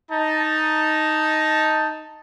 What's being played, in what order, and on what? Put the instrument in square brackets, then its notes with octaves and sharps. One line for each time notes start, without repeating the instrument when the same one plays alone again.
[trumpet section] D#4 A5